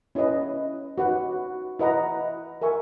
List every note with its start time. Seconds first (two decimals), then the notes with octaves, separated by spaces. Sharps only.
0.15 C#4 E4 B4 D#5
0.98 D#4 F#4 B4 F#5
1.79 E4 B4 D#5 F#5 A#5
2.62 A#4 E5 G#5 C#6